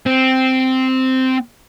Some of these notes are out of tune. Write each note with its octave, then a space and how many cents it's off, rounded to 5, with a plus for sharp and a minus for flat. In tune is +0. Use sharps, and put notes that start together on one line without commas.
C4 -5